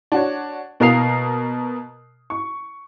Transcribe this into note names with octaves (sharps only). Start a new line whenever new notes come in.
D4 F#4 C#5
B2 A#3 A#4 D#6 C7 F7
C#6